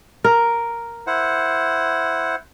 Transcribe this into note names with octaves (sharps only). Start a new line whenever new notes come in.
A#4
E4 C5 F#5